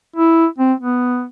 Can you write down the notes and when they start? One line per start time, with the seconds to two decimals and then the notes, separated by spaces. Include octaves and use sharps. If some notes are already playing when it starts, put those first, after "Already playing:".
0.16 E4
0.58 C4
0.80 B3